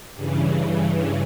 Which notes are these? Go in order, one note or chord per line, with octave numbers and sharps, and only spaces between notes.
G2 C#3 E3